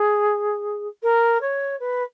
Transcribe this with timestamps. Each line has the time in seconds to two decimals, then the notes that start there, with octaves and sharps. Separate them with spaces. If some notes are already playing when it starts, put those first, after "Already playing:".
Already playing: G#4
1.03 A#4
1.41 C#5
1.80 B4